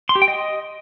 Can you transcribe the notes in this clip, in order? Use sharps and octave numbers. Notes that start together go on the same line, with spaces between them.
C6
G4
G5
D#5